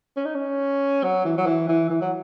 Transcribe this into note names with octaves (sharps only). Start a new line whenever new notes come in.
C#4
D#4
C#4
F#3
E3
F#3
E3
E3
E3
F#3